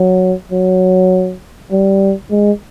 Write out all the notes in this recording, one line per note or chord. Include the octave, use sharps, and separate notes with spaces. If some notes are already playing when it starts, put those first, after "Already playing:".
Already playing: F#3
F#3
G3
G#3